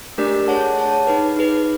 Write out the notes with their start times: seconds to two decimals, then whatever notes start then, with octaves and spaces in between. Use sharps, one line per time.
0.18 A3 D4 G4 A#4 D5
0.48 G#4 C#5 F#5 A5
0.78 G#4 C#5 F#5 A5
1.07 D#4 G#4 B4
1.36 D#4 G#4 B4